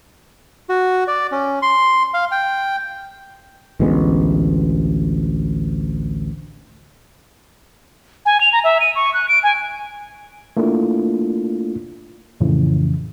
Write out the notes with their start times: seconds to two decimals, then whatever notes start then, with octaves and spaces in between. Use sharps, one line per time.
0.69 F#4
1.08 D5
1.32 C#4
1.62 C6
2.14 F5
2.32 G5
3.80 A1 D2 G#3 B3
8.26 G#5
8.41 F7
8.53 A#5
8.64 E5
8.80 D#7
8.95 C#6
9.14 F#6
9.28 D7
9.43 G#5
10.57 A3 A#3 D4 E4 F4
12.40 F2 A2 C#3 E3